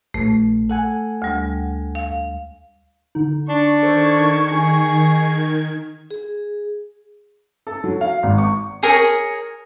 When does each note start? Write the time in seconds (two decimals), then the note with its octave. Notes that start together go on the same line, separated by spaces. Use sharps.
0.14 A#1 A3
0.70 A4 F#5 G#5
1.22 D2 G3
1.95 F5
3.15 D3 D#4
3.49 D4 C#6
3.83 D#3 A4 C5 G#6
4.51 D#4 G#4
6.11 G#4
7.67 A4
7.84 F#3
8.01 F5
8.23 G#1
8.38 C#6
8.83 G#4 A#4 C#5